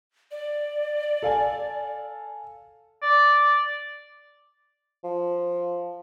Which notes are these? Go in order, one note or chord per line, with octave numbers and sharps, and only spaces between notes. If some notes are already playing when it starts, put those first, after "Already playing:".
D5
A4 F5 G#5
D5
F3